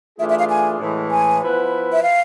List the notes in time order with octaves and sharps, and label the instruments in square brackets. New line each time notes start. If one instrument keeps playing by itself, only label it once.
[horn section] E3 A3 D4 F4 G#4 [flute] E5
[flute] E5
F5
G#5
[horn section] A2 E3 G#3
[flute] G#5
[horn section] F3 B3 E4 B4
[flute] E5
F5